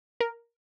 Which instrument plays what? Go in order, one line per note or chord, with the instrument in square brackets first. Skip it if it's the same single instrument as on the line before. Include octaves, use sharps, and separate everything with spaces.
[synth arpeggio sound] A#4